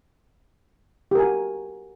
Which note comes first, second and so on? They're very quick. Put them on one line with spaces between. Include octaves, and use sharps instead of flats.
G4 A#4 G#5 F#4